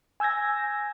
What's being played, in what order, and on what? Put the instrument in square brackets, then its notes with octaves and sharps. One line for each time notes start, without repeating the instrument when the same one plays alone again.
[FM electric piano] G#5 E6 G6 G#6 A#6